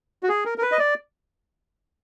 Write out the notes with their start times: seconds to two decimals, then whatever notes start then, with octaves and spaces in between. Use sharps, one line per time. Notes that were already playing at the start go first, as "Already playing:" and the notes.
0.23 F#4
0.29 G#4
0.45 A#4
0.58 A#4
0.62 B4
0.72 D#5
0.79 D5